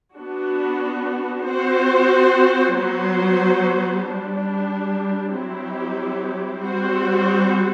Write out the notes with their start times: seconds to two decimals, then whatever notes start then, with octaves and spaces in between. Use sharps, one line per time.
0.17 B3 D4 F#4
1.46 C4 F#4 C5
2.74 F#3 B3 F#4 C5
4.03 G3 D4 G4
5.32 F#3 C4 E4 G4
6.60 G3 C4 F#4 C5